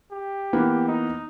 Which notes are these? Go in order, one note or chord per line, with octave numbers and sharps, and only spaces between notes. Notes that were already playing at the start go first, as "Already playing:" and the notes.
G4
E3 A#3 B3
D#4